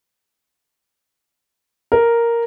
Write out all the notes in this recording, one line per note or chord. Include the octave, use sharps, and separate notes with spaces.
A#4